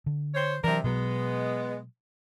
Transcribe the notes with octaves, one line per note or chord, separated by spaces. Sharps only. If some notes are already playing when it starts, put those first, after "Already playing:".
D3
C5 C#5
C3 E3 F#3 D4 A#4
B2 F#3 G#3 B3